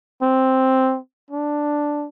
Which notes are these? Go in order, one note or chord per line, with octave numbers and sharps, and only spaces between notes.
C4
D4